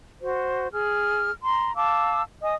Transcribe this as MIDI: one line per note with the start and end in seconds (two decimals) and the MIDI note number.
0.22 0.68 66
0.22 0.68 72
0.73 1.30 68
0.73 1.30 89
1.43 1.75 82
1.43 1.75 84
1.75 2.22 77
1.75 2.22 81
1.75 2.22 86
1.75 2.22 88
2.43 2.54 75
2.43 2.54 80
2.43 2.54 87